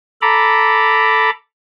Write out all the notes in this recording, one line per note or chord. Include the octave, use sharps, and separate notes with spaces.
A4 A#5 B5 D6